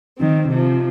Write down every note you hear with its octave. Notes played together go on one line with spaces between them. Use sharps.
D#3 C4
C3 F3